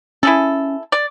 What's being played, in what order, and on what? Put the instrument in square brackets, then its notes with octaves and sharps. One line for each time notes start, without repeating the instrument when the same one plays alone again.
[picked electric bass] C#4 [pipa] E4 G#4 A4
[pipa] D5